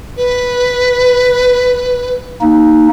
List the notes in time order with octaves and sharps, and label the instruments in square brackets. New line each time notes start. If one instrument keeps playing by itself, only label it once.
[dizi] B4
[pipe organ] A#3 D#4